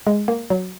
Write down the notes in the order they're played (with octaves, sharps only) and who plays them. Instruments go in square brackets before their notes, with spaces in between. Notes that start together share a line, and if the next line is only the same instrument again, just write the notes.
[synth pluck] G#3
A#3
F#3